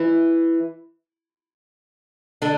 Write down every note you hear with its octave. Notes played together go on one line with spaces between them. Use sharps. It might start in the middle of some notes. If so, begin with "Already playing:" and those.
Already playing: E3 E4
D3 D4